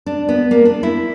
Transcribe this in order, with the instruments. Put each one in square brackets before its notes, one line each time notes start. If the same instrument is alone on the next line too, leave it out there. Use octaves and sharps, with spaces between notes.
[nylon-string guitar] D4
B3
A#3
D4
E4